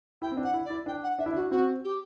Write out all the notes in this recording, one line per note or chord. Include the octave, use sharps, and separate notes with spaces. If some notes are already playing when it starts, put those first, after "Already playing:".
E4 G5
C4
D4
F#5
E4
D5
E4
D4 G5
F#5
D4 E5
E4
D4 F#4
C4 F#4
G4